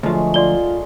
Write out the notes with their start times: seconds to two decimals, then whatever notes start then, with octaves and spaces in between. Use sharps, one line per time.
0.03 D2 F3 F#3 G#3 A3
0.34 F4 D5 A#5 C6 G7